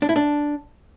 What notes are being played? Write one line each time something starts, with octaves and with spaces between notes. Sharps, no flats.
D4
E4
D4